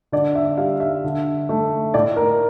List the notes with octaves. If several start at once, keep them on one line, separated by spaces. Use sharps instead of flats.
D3 D5
E5
G3 F5
E5
D3
A3
A2 D5
A#4